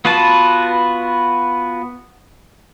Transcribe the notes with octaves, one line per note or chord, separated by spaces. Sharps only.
B3 F4 F#4 B4 A5